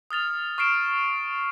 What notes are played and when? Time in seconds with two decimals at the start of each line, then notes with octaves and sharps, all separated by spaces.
0.11 D#6 F6 A6 F7
0.58 C#6 F6 C7 D7 E7